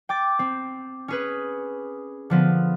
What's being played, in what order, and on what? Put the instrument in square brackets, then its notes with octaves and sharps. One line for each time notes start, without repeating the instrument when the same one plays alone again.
[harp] G5 D6 A6
C4
C#4 G#4 B4
D3 F3 B3